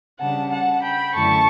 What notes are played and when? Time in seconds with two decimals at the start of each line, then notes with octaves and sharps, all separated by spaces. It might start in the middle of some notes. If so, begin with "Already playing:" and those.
0.20 C#3 G3 D4 F#5 A5
0.51 F#5 A5
0.82 G5 B5
1.14 F#2 D3 A3 E4 A5 C#6